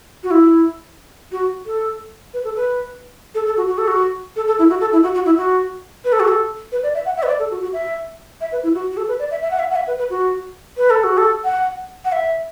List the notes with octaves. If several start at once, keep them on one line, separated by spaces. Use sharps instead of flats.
F#4
E4
F#4
A4
B4
A4
B4
A4
A4
F#4
F#4
A4
F#4
A4
A4
E4
F#4
A4
E4
F#4
F#4
E4
F#4
B4
A4
F#4
A4
B4
D5
E5
F#5
E5
B4
D5
A4
F#4
F#4
E5
E5
B4
E4
F#4
F#4
A4
B4
D5
E5
E5
F#5
E5
F#5
E5
B4
B4
F#4
B4
A4
F#4
A4
F#5
F#5
E5